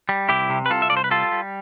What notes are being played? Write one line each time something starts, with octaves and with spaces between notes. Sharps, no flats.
G3
C2 E4 G4
C3
B4
C2 F4 A4
E5
C2 D5
C5
B4
G3 F4 A4
G3